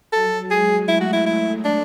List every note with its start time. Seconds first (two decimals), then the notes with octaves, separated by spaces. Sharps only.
0.13 F#3 A4
0.50 G#3 G#4
0.88 A3 E4
1.00 F#4
1.13 E4
1.26 E4
1.64 D4